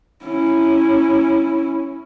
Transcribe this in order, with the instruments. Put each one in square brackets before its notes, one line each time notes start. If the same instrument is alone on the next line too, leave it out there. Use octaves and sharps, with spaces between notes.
[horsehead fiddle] C#4 E4